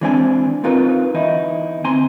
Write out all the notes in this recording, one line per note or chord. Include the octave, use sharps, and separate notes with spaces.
E3 G#3 C4 D4 G4 G#5
C4 D#4 F4 A#4 B4
E2 D#4 E4
D2 C4 G#5 A#5 C6